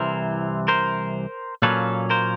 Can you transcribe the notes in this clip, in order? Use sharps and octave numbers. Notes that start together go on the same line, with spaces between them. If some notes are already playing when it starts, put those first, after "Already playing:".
Already playing: C2 C3 E3 A#4 C5
A#4 C5
A#2 F#3 A#3 C#4 A4 B4
A#4 C5